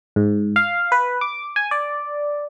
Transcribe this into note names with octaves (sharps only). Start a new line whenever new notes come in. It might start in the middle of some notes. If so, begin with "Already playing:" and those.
G#2
F5
B4
D6
G#5
D5